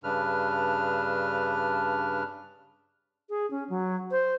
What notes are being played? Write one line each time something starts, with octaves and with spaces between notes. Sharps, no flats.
G2 C#3 D4 B4 F6
G#4
C#4
F#3
C5